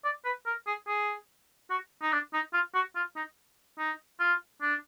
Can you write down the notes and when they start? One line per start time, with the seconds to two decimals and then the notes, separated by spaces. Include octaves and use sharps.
0.04 D5
0.25 B4
0.46 A#4
0.67 G#4
0.88 G#4
1.70 F#4
2.02 D#4
2.12 D4
2.34 D#4
2.53 F4
2.75 F#4
2.96 F4
3.16 D#4
3.78 D#4
4.20 F4
4.62 D4